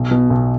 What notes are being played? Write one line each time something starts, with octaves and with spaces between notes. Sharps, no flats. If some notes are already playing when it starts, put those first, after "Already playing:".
Already playing: B1
B2
B1